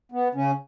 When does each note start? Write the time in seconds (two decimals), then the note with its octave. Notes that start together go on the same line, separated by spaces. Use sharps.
0.12 B3
0.34 C#3 C#4